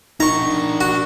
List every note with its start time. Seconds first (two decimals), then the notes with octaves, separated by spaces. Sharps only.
0.20 D4 D#4 A#4 A#5 C#6
0.81 F#4